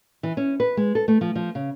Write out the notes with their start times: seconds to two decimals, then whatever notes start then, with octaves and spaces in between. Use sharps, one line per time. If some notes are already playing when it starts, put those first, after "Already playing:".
0.23 E3
0.37 C#4
0.60 B4
0.77 G#3
0.95 A4
1.08 A3
1.21 F3
1.35 F3
1.55 C#3